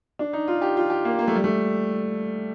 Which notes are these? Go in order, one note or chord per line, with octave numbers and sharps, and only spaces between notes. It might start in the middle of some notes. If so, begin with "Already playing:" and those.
D4
D#4
F4
G4
F4
G4
A#3
A#3
A3
G3
A3